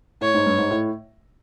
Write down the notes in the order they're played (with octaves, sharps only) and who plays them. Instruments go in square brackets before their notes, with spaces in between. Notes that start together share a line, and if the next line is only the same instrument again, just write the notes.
[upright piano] A2 [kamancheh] C#5
[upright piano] G#2
G2
G#2
A2